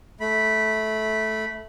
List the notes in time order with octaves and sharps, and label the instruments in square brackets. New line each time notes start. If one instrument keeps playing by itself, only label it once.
[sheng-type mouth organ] A3 B5